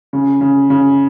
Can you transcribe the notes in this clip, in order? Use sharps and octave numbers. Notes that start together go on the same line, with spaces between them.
C#3
C#3
C#3